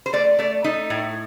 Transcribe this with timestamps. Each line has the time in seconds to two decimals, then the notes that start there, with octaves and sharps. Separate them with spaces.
0.06 C5
0.13 A3 D5
0.39 A3 D5
0.64 A3 D#4
0.90 A2